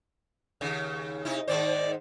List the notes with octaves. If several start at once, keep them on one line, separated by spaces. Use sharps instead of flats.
D#2 C#3
C3 D#4 E4
G#2 D#3 C5 D5